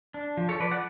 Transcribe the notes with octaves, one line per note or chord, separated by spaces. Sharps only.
D4
F3
A4 C#5
F3 B4 D5
D5 F#5